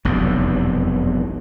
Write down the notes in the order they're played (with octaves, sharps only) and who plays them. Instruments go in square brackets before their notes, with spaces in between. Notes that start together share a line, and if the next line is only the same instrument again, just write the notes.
[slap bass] F1 B1 E2 G2